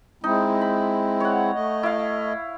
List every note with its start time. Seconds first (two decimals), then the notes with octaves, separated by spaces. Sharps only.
0.24 G#3 C4 D#4 E4
0.61 B5
1.20 C#5 F#5
1.54 A3 D#5
1.83 E4 F5